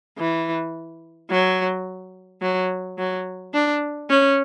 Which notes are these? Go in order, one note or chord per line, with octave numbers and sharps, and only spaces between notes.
E3
F#3
F#3
F#3
D4
C#4